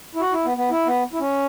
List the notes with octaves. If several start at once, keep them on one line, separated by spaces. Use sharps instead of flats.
E4
F#4
E4
B3
B3
E4
B3
E4
C#4